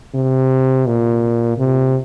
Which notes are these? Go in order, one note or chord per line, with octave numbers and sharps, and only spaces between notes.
C3
A#2
C3